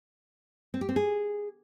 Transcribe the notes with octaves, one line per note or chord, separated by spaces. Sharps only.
C4
G4
C4
G#4